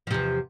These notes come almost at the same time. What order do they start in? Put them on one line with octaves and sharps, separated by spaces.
F3 C3 E2